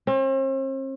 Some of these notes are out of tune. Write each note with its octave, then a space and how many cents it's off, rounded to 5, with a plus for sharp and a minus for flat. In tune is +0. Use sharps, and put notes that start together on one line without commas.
C4 +45